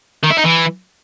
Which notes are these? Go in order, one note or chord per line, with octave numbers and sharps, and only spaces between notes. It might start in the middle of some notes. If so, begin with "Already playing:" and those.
D#3
E4
D#4
E3